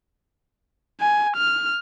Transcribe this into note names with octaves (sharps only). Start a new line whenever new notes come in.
G#5
F6